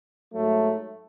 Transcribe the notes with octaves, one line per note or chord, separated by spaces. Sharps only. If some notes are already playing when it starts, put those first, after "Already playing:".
G#2 F#3 A3